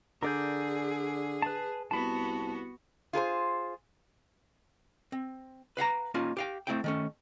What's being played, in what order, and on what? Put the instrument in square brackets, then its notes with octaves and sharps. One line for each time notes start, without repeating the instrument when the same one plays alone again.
[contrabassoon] D3 [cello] G#4 [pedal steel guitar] A#4 D5 G6
[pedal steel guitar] B4 A5
[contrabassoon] C2 [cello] B3 F#4 [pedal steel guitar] A5 B5
[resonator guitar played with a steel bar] F4 G#4 A#4 C5
[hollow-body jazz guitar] C4
B4 F5 F#5 A#5
A#3 C#4 D#4 F4
G4 F5 G5
A3 C4 E4 F5 G5
D#3 A3 C#4